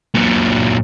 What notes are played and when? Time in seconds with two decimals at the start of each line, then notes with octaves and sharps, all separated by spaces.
0.14 A#2 F#3